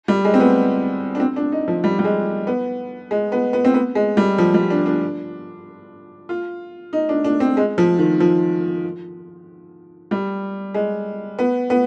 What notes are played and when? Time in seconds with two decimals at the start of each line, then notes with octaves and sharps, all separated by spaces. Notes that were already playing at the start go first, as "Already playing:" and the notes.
0.08 G3
0.25 G#3
0.34 C4
0.40 B3
1.15 D4
1.20 C4
1.36 D4
1.52 D#4
1.68 F3
1.84 G3
1.99 G3
2.04 G#3
2.47 B3
3.11 G#3
3.32 B3
3.53 B3
3.65 C4
3.74 B3
3.95 G#3
4.17 G3
4.38 F3
4.54 G3
4.70 D4
4.86 D4
6.29 F4
6.93 D#4
7.09 D4
7.24 D4
7.40 C4
7.57 G#3
7.78 F3
7.99 D#3
8.20 F3
10.11 G3
10.74 G#3
11.39 B3
11.70 B3